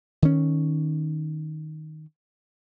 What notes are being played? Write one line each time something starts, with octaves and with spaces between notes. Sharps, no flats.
D#3 C#4